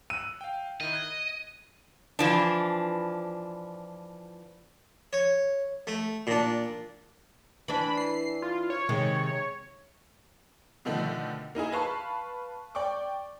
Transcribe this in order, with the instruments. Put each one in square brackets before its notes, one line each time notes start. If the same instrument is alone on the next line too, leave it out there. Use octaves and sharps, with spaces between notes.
[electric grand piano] E6 F#6 [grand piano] D#7
[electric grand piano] F5 G5
[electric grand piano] D#3 E4 [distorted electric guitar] D#5
[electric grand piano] F#6 G#6
[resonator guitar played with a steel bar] E3 F3 D4
[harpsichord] C#5
A3
A#2 D4
[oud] E3 D4 [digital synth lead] B5
[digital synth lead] C7
F4
C#5
[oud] C3 D#3 G#3
[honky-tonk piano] B2 D3 D#3 F3 A3
A#3 D#4 E4 G#4
B4 F5 A5 B5 C#6
D5 G5 C#6 D6